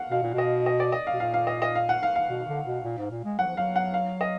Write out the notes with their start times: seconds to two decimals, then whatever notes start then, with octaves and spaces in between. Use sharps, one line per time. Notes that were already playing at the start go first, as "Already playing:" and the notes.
Already playing: F5 F#5
0.11 B2 F5
0.23 A#2
0.34 B2 D#5
0.66 D#5
0.80 D5
0.92 D#5
1.07 F5
1.14 B2
1.20 A#2 F5
1.34 F5
1.47 D#5
1.62 D#5
1.75 F5
1.89 F#5
2.03 F5
2.16 F5
2.30 B2
2.48 D3
2.66 B2
2.84 A#2
2.98 G#2
3.11 A#2
3.24 G#3
3.39 F#3 F#5
3.47 F3
3.56 F#3 F5
3.76 F#5
3.94 F5
4.21 D#5